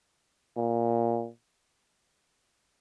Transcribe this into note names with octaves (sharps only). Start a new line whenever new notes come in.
A#2